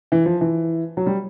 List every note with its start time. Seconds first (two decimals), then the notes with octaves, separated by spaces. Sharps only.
0.12 E3
0.26 F3
0.41 E3
0.97 F#3
1.06 G3